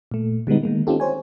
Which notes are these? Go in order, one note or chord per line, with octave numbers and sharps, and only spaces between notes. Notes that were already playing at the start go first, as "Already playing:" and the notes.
A#2 A3
D3 G3 G#3 B3 D#4
D#3 G#3 A#3
C4 C#4 D#4 F4 G4 A4
C5 C#5 G#5